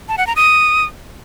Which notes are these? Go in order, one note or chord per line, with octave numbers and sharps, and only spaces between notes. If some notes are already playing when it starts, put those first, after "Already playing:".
A5
F#5
A#5
D#6